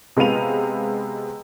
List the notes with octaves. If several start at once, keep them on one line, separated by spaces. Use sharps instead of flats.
C3 G#3 B3 F5 D#7 F7